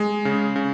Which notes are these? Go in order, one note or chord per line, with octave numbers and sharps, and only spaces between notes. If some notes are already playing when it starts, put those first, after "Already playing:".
Already playing: G#3
C#3
C#3